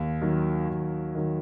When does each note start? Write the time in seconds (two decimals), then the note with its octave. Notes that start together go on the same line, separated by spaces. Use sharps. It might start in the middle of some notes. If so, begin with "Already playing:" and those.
Already playing: D#2
0.22 D#3 F#3
0.69 D#2
1.15 D#3 F#3